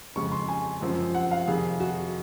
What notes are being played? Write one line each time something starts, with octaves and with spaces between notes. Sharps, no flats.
F2 C#3 G#3 C#6
C6
G#5
F#2 F3 G#3 C4
F#5
F5
F2 C3 D#3 G#4
F#4